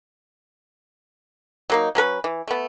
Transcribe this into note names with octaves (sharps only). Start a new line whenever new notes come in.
F#3 A#3 D#4
F#3 C#4 A#4 B4
E3
A3 B3